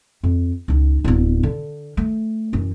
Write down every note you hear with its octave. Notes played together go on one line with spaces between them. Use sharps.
F2
C#2 D#4
D1 B3
D3
A3
F#2 E3